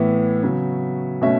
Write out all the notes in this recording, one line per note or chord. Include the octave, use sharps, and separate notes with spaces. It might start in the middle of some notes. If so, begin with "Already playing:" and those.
Already playing: A2 E3 B3 E5
C#3 F#3 B3
B2 A3 C#4 E5